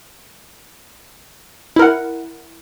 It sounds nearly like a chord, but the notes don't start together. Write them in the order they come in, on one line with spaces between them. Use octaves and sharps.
E4 A#4 F#5